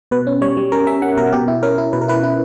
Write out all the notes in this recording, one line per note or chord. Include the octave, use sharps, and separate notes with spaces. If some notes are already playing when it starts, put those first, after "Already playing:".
B2 B4
C#4
G3 C#5
G3
C#4 A#4
C#4 E5
C#4 F#5
B2 A#4
B2 G4
E4
C#4 A#4
E4
B2 B4
A#4
E4 B4
E4